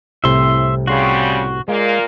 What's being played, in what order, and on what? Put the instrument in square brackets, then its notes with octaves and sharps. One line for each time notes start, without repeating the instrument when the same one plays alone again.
[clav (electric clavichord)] C2 A2 C3 [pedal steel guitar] E5 C6
[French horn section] C#3 G3 [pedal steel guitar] F#4 C6
[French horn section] A#2 A#3 [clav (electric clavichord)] G#3